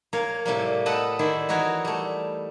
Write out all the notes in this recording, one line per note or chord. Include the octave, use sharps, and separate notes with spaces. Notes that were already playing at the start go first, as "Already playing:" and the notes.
A#3 A#4 C#5 F5
A2 C3 G3 A#3
A4 B4 D#5 F#5 G5 A5
D#3 E4 C5 D5
E3 D#4 F#4 A#4 C#5
G3 A3